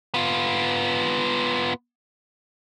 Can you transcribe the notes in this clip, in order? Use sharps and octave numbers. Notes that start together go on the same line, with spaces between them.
B3 F4